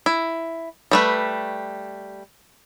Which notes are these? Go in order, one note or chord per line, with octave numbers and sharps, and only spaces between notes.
E4
G3 A3 B4